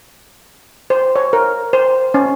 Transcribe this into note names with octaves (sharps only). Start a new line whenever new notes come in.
C5
C#5
A#4
C5
C#4